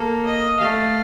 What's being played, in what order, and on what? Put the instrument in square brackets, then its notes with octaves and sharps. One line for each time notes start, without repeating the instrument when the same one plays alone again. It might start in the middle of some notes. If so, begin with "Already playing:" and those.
Already playing: [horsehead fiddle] A#3 [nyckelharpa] A4
[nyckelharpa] D#5
[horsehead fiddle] A3 [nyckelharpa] F5